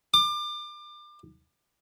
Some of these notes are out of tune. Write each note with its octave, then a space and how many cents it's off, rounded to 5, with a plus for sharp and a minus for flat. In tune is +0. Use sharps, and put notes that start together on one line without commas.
D6 +30